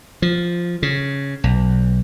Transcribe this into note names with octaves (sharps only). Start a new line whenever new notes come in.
F3
C#3
B1